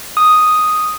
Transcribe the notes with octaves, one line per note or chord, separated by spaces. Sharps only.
D#6